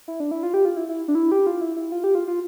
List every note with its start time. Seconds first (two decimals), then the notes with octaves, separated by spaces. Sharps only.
0.08 E4
0.20 D4
0.31 E4
0.43 F4
0.54 G4
0.65 F4
0.77 E4
0.89 E4
1.08 D4
1.15 E4
1.32 G4
1.47 F4
1.61 E4
1.77 E4
1.92 F4
2.04 G4
2.15 F4
2.28 F4